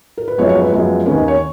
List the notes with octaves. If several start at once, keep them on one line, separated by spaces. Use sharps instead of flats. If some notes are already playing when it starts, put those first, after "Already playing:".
A#4
B4
F#2 F3 G#3 B3 C#5
C#5
B4
F#2 F3 G#3 B3
D#2 D#3 A#3 C#4 B4
D#5
C#5